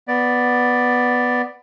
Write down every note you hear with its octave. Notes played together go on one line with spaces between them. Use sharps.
B3 D5